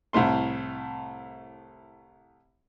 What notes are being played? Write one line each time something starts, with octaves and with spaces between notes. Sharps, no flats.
C2 A2 A3 C6